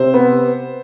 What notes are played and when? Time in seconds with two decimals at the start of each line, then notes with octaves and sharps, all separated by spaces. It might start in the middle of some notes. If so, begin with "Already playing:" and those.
Already playing: C3 C5
0.14 B3